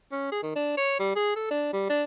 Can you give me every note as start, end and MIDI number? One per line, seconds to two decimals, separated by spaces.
0.12 0.31 61
0.32 0.40 68
0.43 0.54 51
0.56 0.77 62
0.78 0.95 73
1.00 1.15 55
1.16 1.34 68
1.36 1.49 69
1.51 1.68 62
1.73 1.85 55
1.89 2.04 62